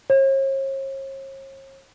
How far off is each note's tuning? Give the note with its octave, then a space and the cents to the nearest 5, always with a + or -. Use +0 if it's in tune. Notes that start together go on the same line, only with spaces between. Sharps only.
C#5 -45